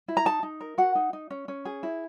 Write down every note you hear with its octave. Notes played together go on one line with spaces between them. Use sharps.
E4
A#5
D#4 A5
D#4
A#4
F#4 F#5
D#4
D#4
C#4
C#4
G#4
E4